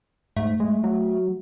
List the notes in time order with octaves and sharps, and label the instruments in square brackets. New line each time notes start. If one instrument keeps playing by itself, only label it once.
[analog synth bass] G#2 [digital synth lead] A3
[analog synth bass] G#3
F#3